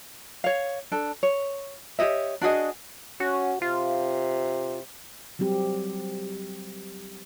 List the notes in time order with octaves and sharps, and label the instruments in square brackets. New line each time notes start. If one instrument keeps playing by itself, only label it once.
[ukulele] C#5 F5
D4 A4
C#5
G4 C#5 D#5 E5
D4 F#4 G#4 D#5
[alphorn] C#4 [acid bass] F#4
[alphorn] C3 [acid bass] F4
[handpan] F#3 G3 C4 G4